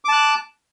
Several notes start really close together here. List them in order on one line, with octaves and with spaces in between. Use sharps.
D6 A5 F#6